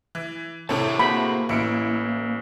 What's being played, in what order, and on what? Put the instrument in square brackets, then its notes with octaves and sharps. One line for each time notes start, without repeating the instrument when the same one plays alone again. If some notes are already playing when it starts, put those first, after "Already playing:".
[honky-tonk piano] E3
[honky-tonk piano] A2 C3 A4 [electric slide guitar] E4 G4 A5 [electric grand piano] C#5
[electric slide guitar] A#3 [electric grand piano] F#4 G#4 C5 [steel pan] B5
[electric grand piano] A1 C#7 D7 [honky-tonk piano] E4